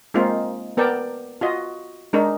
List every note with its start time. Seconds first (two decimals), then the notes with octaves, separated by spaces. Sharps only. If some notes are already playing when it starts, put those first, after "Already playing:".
0.14 G#3 A#3 C4 D#4 F4
0.77 B3 A#4 D5 G5 A5
1.41 F4 F#4 D#5
2.13 G#3 D4 D#4 A#4